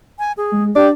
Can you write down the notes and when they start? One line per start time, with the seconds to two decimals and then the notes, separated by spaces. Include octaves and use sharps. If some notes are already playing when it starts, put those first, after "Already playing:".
0.19 G#5
0.37 G#4
0.52 G#3
0.76 D4 G4 D5